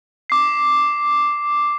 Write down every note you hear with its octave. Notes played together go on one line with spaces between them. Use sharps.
D6 C7